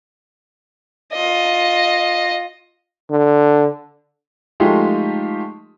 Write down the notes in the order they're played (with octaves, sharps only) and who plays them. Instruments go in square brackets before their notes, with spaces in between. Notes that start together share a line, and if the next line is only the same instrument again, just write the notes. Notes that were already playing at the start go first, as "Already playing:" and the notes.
[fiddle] F4 D#5
[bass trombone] D3
[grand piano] F3 G#3 A3 D#4 F4 G4